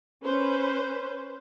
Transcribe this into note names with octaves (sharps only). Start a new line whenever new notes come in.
C#4 B4 C5